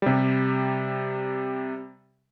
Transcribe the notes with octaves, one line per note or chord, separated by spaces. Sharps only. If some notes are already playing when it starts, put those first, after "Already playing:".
C3 G3